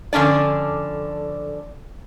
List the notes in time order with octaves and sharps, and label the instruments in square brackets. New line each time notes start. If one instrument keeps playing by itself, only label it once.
[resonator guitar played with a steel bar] F2 D3 C#4 D4 D5